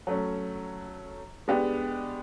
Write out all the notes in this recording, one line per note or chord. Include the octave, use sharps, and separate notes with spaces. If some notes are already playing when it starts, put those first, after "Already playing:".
F#3 A3 C#4
G#3 B3 D4 G4